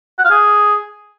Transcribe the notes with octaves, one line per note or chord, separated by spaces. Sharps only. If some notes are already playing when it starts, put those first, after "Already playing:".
F#5
F5
G#4